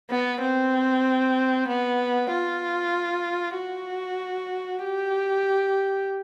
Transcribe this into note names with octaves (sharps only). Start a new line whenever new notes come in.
B3
C4
B3
F4
F#4
G4